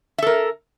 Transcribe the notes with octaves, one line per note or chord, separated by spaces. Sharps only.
A4 A#4 E5